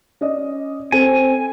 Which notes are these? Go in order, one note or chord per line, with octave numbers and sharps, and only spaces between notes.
C#4 D5 D#5
C4 A4 G#5